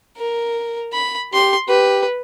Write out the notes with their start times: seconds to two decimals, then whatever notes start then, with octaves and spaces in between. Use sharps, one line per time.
0.17 A#4
0.93 B5
1.33 G4 C6
1.69 G4 B4